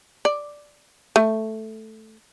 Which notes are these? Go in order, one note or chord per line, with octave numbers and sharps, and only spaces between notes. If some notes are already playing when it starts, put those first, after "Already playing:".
D5
A3